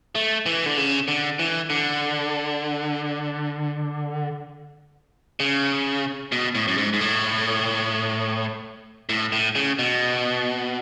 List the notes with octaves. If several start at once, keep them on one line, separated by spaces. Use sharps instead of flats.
A3
E3
D3
C#3
D3
E3
D3
C#3
B2
A2
F#2
G#2
G#2
A2
A2
A2
C#3
B2